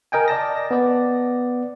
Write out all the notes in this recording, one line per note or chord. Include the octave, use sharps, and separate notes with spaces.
A#4 D#5 G5 G#5
D5 D#5 A5 A#6
B3 D5